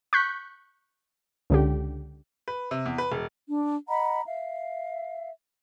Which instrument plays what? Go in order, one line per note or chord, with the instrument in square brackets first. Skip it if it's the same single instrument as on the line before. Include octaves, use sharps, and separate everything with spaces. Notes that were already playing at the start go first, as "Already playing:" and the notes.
[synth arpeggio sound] C#6 F#6 G6 B6
C#2 D3 G4
[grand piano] B4
C3
E2
B4
E1
[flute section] D4
D#5 F#5 A#5 B5
E5 F5